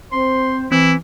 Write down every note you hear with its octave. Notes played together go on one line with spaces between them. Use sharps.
C4 C5 C6
E3 C4 E4